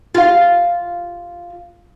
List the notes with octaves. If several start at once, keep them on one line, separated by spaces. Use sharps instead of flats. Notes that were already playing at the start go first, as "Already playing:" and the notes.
F4 F5